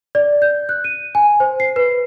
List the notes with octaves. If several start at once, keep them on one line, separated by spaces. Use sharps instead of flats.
D5
G6
F#6
D#7
G#5
C5
C7
B4